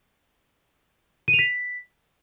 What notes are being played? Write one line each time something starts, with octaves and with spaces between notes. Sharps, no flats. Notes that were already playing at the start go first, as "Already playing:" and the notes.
D#7
F7
B6